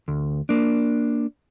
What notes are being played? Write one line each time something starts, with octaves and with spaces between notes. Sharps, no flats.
D2
A#3 D4